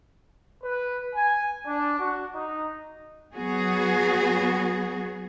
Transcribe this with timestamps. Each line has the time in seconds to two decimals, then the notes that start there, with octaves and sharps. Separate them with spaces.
0.62 B4
1.15 G#5
1.65 D4
1.99 F#4
2.34 D#4
3.35 F#3 B3 F#4 G#4